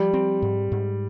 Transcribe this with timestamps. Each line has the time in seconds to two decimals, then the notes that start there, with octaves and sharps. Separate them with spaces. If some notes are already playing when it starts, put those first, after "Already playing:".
Already playing: F3 G3
0.13 C4
0.42 G#2
0.72 G#2